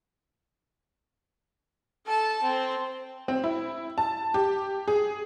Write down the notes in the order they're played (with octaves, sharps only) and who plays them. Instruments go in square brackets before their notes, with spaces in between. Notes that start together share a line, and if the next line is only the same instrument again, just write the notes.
[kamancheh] A4 A5
C4
[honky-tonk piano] C4
E4
A5
G4
G#4